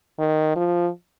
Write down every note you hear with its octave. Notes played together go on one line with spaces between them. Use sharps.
D#3
F3